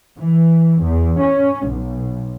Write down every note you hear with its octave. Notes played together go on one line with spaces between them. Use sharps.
E3
E2
C#4
B1